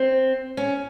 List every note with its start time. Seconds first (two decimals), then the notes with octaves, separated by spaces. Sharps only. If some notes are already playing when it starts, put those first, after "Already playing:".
Already playing: C4
0.57 C#4